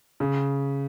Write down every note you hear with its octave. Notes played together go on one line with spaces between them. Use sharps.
C#3